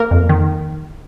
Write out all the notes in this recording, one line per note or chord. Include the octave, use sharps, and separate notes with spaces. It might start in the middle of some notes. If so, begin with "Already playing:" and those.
Already playing: A#3 A#4
F2
D#3